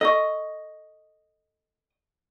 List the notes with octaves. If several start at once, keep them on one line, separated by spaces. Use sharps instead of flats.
A4 D#5 C#6